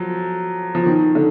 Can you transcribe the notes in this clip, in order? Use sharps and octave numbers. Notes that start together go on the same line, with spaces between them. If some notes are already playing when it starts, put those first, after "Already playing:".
Already playing: F3 F#3
F3
D#3
D3